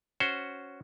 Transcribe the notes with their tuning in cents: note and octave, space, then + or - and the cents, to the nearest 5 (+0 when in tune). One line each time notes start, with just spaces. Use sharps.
C#4 +0 F#4 +0 C5 +0